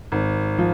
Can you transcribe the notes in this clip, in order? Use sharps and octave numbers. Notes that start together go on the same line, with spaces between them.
G#1
F3